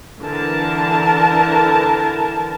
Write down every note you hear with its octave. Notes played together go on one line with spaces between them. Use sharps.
D3 E3 A#4 A5